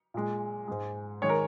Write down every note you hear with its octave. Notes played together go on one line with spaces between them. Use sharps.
A#2 G#3
G#2 G#3
D#3 G#3 C#5
A#4